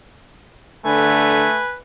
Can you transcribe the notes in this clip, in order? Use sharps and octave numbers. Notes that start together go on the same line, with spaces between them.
D3 A3 B4 G#5